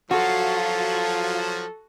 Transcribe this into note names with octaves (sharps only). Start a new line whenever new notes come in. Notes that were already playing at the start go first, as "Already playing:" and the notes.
F3 F#3 F4 F#4 A4